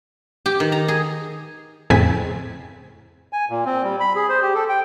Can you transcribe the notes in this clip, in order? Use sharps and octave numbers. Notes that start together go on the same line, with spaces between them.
G4
D#3
A#5
G#4
F2 A2 C#3 C4 G#5 B6
G#5
A#2
C4
G3
B5
G#4
C5
G4
A4
G5